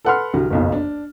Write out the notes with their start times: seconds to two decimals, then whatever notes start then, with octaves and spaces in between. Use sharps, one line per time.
0.05 A4 B4 F#5 B5 C6 F6
0.34 C2 D3 F#3
0.50 F#1 B1 F2
0.72 D4